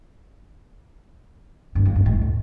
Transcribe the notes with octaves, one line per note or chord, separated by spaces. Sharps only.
G2
F2
G2
A2